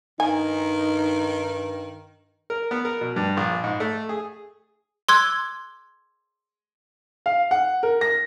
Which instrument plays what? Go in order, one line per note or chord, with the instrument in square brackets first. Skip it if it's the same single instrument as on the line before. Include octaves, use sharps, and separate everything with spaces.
[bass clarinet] G2 [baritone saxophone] D#3 [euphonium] D#4 [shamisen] G#5
[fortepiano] A#4
B3
A#4
B2
G2
A#1
G#2
A3
G#4
[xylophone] C6 D6 E6 F#6 G#6
[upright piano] F5
F#5
A#4
A#6